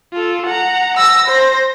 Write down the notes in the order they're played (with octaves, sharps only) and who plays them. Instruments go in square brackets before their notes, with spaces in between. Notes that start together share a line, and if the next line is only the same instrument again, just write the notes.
[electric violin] F4 A4
F#5 A#5
[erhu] E6 [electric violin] A#6
[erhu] C5